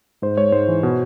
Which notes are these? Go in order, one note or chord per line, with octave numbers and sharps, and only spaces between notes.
G#2 C5
G#3 C#5
G#2 C5
E3
B2